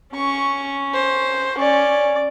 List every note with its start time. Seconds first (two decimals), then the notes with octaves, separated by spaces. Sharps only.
0.14 C#4 C#6
0.94 C5
1.59 C#4 D5